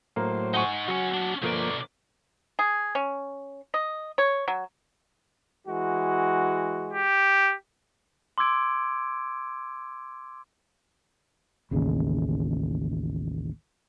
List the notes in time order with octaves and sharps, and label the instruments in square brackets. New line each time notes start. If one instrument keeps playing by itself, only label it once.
[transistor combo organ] A2 F#3 C5 [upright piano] A#3
[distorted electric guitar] D#4 G#5 [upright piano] F#5 C#6
[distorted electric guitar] C#2 C#4 [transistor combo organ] F#3 F#4
[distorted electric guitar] C#4 D4
[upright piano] G1 [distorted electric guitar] B2 D5 [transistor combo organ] F3 A#3
[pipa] G#4
C#4
D#5
C#5
F#3
[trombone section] E3 G#3 F#4
[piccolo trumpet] G4
[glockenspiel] C6 D6 E6 G#6 D7
[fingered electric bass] A1 D#2 C#3